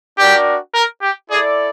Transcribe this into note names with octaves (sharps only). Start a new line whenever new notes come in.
D4 F#4 G4 A#4 D5 G5
A#4
G4
E4 G#4 A4 D5